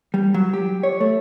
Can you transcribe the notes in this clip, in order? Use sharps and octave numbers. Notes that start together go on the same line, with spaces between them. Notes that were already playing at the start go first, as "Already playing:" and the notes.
G3
F#3
G4
C#5
A3